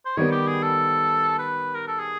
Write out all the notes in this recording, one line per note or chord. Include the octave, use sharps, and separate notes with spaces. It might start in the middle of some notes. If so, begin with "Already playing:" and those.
C5
D#3 G3 B3 C#5
G4
G#4
A4
B4
A#4
A4
G#4